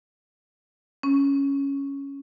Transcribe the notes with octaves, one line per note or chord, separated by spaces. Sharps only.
C#4